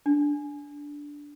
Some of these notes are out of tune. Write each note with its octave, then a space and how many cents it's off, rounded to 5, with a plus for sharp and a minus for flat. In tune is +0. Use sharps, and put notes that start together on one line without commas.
D4 -10